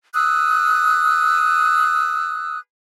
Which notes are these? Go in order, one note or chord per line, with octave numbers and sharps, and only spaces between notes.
D#6 E6 F#6